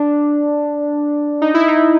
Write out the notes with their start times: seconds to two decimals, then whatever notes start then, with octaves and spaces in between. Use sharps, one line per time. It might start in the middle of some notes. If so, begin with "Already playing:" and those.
Already playing: D4
1.42 D#4
1.54 E4
1.68 D#4